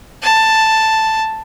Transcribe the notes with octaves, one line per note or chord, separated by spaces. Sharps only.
A5